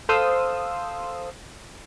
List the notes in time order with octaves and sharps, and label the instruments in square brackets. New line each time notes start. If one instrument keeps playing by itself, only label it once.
[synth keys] A4 C5 F5 C6 D#6 E6